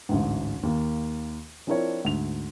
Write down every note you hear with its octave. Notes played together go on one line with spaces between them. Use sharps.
A1 D2 G#2
D#2 A#3
F3 C4 D4 E4 A#4 C#5
D2 G#2 F7